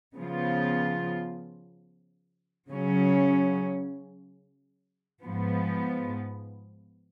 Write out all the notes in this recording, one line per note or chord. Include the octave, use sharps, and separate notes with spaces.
C#3 F3 B3 F4
C#3 F#3 C#4
G#2 F3 B3